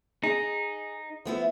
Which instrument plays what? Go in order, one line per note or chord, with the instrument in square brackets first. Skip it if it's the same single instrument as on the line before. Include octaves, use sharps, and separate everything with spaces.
[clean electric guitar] D#4 [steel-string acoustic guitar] G#4
[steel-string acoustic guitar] F3 B3 E4